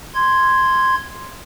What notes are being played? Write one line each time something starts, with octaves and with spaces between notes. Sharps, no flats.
C6 G#6